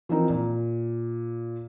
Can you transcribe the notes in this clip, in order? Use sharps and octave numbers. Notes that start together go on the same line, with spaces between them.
E3 F3 C4 D#4 A#4
A#2